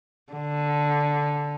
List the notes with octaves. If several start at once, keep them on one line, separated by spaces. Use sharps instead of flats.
D3